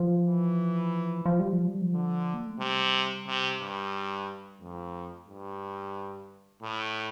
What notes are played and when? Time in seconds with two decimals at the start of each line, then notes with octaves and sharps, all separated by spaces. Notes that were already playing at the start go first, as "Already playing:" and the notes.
Already playing: F3
0.25 E3
1.26 F3
1.40 G3
1.53 F3
1.67 G3
1.81 F3
1.92 D3
2.34 A#3
2.47 A3
2.60 C3 G3
3.27 C3
3.60 G2
4.61 F2 A3
5.28 G2
5.95 D3
6.63 A2